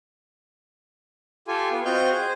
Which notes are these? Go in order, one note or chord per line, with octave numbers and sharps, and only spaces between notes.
F4 G4 A4 G#5
B3 F4
C4 F4 F#4 D#5 F6 G6
G#4 C5